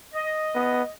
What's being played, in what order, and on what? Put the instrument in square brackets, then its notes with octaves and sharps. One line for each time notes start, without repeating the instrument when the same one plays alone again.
[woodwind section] D#5
[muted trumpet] B3